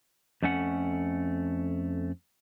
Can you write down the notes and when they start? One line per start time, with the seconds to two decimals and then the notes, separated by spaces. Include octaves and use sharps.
0.43 F2 A3 C#4 F#5